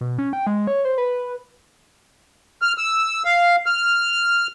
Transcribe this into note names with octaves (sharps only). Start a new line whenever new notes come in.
B2
C#4
G5
G#3
C#5
C5
B4
F6
E6
F5
F6